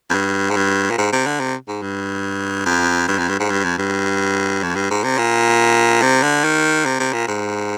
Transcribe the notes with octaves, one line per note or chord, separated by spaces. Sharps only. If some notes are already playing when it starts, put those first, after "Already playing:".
F2
G2
G#2
G2
A#2
G#2
C3
D3
C3
G#2
G2
F2
G2
F2
G2
G#2
G2
F2
G2
F2
G2
G#2
C3
A#2
C3
D3
D#3
C3
C3
A#2
G#2